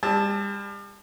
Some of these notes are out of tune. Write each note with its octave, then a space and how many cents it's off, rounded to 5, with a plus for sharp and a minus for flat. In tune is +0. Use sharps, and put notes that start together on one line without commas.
G3 +40 A5 +0 E6 -30